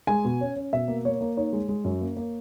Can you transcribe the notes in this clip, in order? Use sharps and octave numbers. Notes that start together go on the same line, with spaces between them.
G#3 G#5
B2
C#4
C#4
B2 E5
A#3
A#3 C#5
A#3
D#4 C#5
G#3
G#3
F#2
A#3
A#3